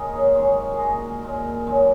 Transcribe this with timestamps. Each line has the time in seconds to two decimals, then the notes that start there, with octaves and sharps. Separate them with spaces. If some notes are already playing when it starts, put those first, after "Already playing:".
Already playing: A#2 G#3 A#4 D#5 F#5
0.13 G#4 C#5
0.34 F#2 D#3 G#3 G#4 C#5
0.73 G#4
0.79 A#2 G#3 F#4 A#4
1.23 A#2 G#3
1.66 F#2 D#3 G#3